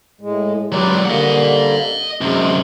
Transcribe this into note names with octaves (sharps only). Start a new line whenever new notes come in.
A2 G#3
F#3 G#3 G4 B4 D5
D3 G3 A#3 D#5 F#5
F#2 C3 G#3